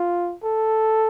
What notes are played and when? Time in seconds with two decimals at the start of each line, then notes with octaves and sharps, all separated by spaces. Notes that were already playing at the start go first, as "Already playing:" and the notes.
Already playing: F4
0.44 A4